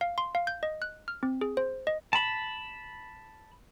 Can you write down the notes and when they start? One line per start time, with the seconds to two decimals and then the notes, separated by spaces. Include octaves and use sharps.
0.01 F5
0.18 C6
0.35 F5
0.47 G6
0.63 D#5
0.82 F#6
1.08 F6
1.23 C4
1.41 G#4
1.57 C5
1.87 D#5
2.13 A5 B5